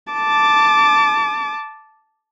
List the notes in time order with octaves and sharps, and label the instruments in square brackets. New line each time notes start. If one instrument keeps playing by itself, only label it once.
[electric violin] A5 D6